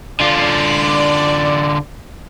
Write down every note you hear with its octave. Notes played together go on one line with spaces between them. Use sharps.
D3 F4 D5